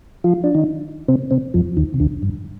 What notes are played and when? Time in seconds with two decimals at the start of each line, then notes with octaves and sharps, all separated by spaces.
0.24 F3 F4
0.44 D4
0.54 D#3 D#4
1.08 C3 C4
1.31 C3 C4
1.54 F2 F3
1.77 D#2 D#3
1.94 C3
2.00 D2 D3
2.23 G2